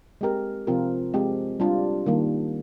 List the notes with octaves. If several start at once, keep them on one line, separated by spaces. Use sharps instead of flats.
G#3 C4 G4 A#4
C3 F3 C4 F4 A#4
G#3 C4 G4
G3 D4 F4
D#3 G3 A#3